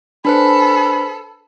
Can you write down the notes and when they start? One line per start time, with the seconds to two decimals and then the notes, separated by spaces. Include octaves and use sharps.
0.25 D4 A4 B4 C5 B5